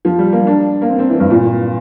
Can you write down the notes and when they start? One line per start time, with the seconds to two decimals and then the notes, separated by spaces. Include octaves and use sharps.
0.05 F3
0.18 G3
0.33 A#3
0.47 D4
0.81 A#3
0.89 C4
0.99 C4
1.09 E3
1.20 G2
1.31 A#2